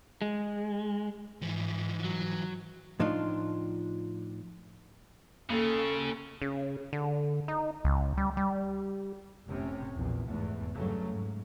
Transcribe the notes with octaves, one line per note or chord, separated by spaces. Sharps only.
G#3
G#2 E3 F3
F#3
A2 F3 D4 D#4 F4
D#2 C#3 A4
C#3
D3
D#4
C#2
G3
G3
F1 A2 C3 C#4
A#1 E2 A#2
F1 E2 G#2 A3
G2 C#3 F#3 A3
G#2